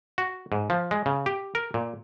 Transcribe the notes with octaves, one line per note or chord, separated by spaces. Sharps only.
F#4
G#2
F3
G#3
C#3
G4
A#4
A#2